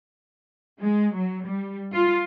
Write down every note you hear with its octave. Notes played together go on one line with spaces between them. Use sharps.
G#3
F#3
G3
F4